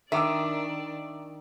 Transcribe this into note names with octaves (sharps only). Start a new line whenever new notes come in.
D#3 D4 D5 E5 D6 E6